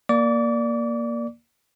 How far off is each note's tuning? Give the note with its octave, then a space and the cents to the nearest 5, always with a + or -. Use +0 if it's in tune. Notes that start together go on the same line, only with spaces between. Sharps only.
A#3 +5 D5 +0 D6 -35